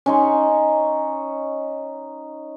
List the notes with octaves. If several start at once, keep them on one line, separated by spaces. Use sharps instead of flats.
C#4 D#4 C6